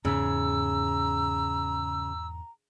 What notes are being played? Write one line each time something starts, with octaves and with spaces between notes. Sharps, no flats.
E2 G#2 C#3 A#5 E6